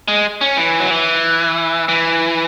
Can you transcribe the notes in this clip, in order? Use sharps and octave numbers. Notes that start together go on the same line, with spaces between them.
G#3
C#4
E3
F#3
E3
E3